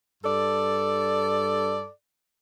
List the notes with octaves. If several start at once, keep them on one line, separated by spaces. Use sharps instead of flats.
G2 A4 D5